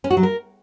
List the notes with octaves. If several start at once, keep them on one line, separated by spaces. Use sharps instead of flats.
C#4
F#4
F#3
A#4